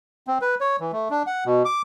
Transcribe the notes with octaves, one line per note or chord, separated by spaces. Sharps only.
C4
B4
C#5
E3
A3
D4
F#5
B2
D6